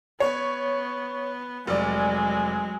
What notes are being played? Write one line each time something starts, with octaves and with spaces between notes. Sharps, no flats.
B3 C#5
F1 F#3 G#3 D5